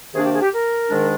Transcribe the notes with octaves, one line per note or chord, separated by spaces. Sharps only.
C3 D#3 A#3 D4 G#4
G4
G#4
G4
A#4
G#2 D#3 G#3 D4